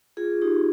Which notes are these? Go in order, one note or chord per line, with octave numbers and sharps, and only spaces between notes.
F4 G#4
D#4 G4